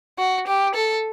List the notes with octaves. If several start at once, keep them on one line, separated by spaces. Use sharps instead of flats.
F#4
G4
A4